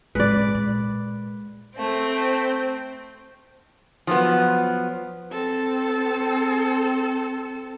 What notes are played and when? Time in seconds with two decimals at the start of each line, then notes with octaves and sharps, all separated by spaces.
0.15 A2 C#3 G#3 B4 D5
0.54 A#2
1.78 A3 C4
4.07 F3 F#3 B3
5.31 C4 A4